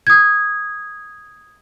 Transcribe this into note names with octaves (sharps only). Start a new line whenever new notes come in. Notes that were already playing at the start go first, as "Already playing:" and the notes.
D#6 G#6